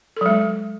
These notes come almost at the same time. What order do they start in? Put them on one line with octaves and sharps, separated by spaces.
A4 F#3 G#3